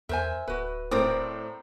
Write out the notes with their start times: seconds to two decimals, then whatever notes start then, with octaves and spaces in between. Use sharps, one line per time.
0.09 E2 A#4 C5 E5 G#5
0.48 D1 F#4 B4
0.91 A2 C4 A#4 D5 D#6